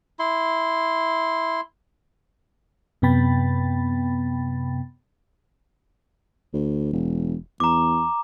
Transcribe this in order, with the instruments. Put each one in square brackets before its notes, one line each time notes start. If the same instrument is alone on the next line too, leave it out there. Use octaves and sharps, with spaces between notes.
[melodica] E4 C6
[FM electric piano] F#2 C3 B3 G5 B5 A6
[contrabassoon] D2
E1
[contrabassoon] E2 [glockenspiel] A#5 D6